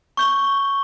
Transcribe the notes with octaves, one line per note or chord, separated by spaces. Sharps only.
C#6 G6 G7